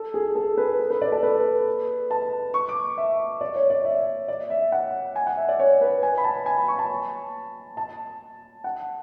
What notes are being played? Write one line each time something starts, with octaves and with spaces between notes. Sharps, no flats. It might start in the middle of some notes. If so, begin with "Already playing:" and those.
Already playing: A4
G#4
A4
B4
A4
B4
D5
A4
B4
A5
C#6
D6
E5
D5
C#5
D5
E5
D5
E5
F#5
G#5
F#5
E5
D5
C#5
B4
G#5
B5
A5
G#5
B5
C#6
A5
A5
F#5